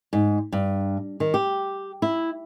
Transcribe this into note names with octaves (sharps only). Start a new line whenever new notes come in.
G#2
G2
D#3
G4
E4